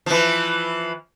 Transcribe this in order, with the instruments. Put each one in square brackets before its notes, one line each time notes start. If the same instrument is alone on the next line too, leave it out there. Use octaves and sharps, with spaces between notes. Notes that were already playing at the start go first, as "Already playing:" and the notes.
[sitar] E3 F3